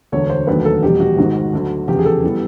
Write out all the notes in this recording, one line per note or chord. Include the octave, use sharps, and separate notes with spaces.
E1 D2 D3 C#5
C5
E1 D#2 D3 F#3 A3 B4
A4
F1 E2 B2 G3 G4
F#4
G#1 G#2 D#3 G#3
D2 D3 F#3
F1 E2 C#3 G4
G#4
A4
E3 G3 B3